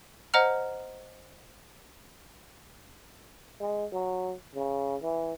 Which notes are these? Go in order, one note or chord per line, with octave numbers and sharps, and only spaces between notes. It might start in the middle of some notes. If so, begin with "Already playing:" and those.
C5 D#5 F#5 A#5 F6
G#3
F#3
C#3
E3